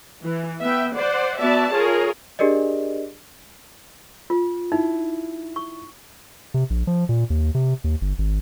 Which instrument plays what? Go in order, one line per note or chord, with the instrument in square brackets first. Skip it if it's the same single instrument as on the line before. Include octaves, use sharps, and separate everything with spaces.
[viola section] E3
B3 E5 G5
C5 D5 F#5
B3 F#4 D5 E5 A5
F4 G#4 A#4 C#5
[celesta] D4 G4 G#4 A#4 D5 D#5
[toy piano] F4
[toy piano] D#4 [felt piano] E4
[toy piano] C#6
[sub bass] C3
A#1
F3
A#2
D#2
C3
D#2
G1
G#1